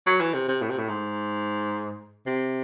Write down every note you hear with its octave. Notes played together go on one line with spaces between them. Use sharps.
F#3
E3
C3
C3
A2
C3
A2
G#2
C3